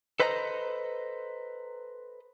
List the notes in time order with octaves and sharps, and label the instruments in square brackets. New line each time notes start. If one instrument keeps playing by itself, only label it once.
[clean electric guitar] A4 B4 C5 D#5 F#5 A#5